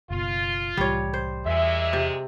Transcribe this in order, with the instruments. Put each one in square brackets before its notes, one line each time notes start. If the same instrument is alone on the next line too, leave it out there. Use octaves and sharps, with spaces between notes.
[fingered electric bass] F#1 B2 [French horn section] F4
[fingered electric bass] C2 A2 E3 [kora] G3 C#5
[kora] C5
[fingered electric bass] E2 [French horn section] A#2 G#3 [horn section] E5
[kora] C3